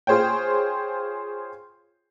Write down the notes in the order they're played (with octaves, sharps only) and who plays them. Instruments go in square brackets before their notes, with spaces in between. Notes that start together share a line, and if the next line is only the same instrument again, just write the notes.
[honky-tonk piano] F4 G#4 C5 C#5 G5